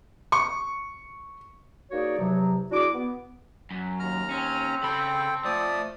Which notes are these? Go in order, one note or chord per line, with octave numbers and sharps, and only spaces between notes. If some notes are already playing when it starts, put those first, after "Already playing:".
C#6
A#3 D#4 F#4 G#4 C#5 D5
E2 C3 F3 F#3
D4 E4 F#4 G#4 D6
B3
F#2
D#2 A#5 F6
C4 C#4
C#3 A4 G5 B5
F3 A3 D5 D#6